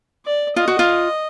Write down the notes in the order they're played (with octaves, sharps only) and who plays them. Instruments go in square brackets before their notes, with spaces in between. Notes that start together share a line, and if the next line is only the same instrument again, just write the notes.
[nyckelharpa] D5
[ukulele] F4 [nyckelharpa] D#5
[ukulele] F#4
F4